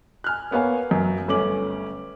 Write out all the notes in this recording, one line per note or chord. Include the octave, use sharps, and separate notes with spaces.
G#5 F6 F#6
A#3 B3 C#5 F5 G#5
F#2
G1 A3 C#4 D6 F#7